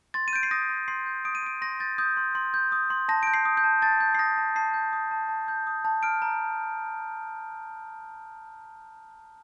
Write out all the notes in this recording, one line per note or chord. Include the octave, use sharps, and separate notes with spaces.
C6 A6
D#7
G6 D7
C7
D#6 A#6
C6
C6 C7
G6
D#6 D7
D#7
C6 D7
C6 A#6
G6 A6
D#6 G6
C6
C6
G6
D#6
C6
A5 A#6
G6 D7
C7
D#6
G6
A5
A5 A6
G6
C7
D#6 A#6
A5
A5 C7
G6
D#6
A5
A5
G6
D#6
A5
F6 D7
A#5